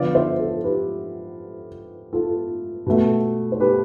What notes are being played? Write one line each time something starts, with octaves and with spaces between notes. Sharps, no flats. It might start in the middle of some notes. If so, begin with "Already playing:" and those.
Already playing: D3 F3 B3 D5 F5
C5 E5
A4 C5
G4 B4
F4 A4
B2 A3
C5
G4 B4